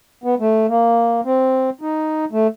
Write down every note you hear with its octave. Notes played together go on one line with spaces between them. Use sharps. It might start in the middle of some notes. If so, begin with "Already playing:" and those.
B3
A3
A#3
C4
D#4
A3